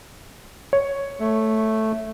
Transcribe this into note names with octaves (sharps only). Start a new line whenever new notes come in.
C#5
A3